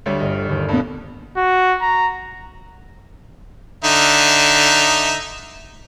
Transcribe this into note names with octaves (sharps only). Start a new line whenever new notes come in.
D2 G3 C#5 A6
G1 D#5 F6
G1 D#2
G2 B2
F#4
A#5
D3 D#4 E5